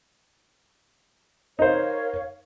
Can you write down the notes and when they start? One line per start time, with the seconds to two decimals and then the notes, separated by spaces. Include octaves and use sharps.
1.59 D#4 A#4 C5 C#5 F5